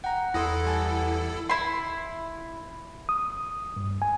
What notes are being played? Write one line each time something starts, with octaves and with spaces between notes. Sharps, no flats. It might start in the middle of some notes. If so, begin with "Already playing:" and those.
F#5 G5 A#5
E2 E4 A4 C6 D#6 A#6
G3 G#5 A5
E4 C6
D#6
G2
G#5